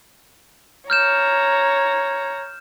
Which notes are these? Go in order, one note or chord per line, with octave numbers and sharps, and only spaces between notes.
C#5 A#5 F6 G6 E7